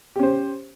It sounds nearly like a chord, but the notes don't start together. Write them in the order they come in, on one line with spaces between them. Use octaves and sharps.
G4 C#4 C5